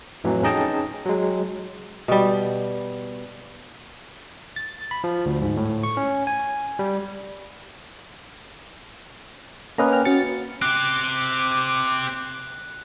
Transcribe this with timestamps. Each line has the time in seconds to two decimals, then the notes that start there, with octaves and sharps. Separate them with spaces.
0.24 F2 A2 E3 F#3
0.43 C#4 D#4 G#4 D#5 G5 A5
1.05 F#3 G#3
2.08 B2 G3
4.56 A6
4.91 B5
5.04 F3
5.26 D2
5.42 G#2
5.57 A2
5.83 C#6
5.97 C#4
6.27 G#5
6.79 G3
9.78 A#3 C#4 A#4 B4 D#5 A#5
9.92 G5 F6
10.05 C#4 F#4 A6 C#7
10.62 C4 G4 D6 F#6